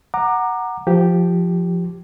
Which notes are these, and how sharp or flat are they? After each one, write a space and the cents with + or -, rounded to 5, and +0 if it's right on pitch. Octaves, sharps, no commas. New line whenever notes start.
F#5 +0 A#5 +0 D6 +30
F3 +0 G4 +0